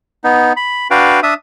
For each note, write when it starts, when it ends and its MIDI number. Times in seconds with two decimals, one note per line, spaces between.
0.24 0.53 59
0.24 0.53 63
0.56 0.88 83
0.91 1.20 62
0.91 1.20 66
0.91 1.20 71
0.91 1.20 77
0.91 1.20 79
1.23 1.34 62
1.23 1.34 76
1.23 1.34 87